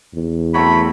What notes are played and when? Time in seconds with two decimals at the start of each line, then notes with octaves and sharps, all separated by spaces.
0.15 E2
0.54 F#3 A3 C4 B5